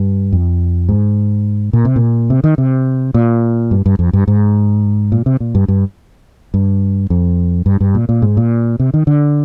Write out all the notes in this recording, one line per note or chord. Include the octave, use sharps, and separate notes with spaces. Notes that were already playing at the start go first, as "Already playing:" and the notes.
Already playing: G2
F2
G#2
A#2
C3
A#2
C3
D#3
C3
A#2
G2
G2
F2
G2
G#2
A#2
C3
A#2
G2
G2
G2
F2
G2
G2
A#2
A#2
G#2
A#2
C3
D#3
D3